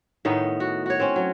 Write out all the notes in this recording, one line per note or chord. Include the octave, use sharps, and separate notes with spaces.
A2 D#3 B3 D#4
F#4
F#4 C#5
C4 C#4
F#3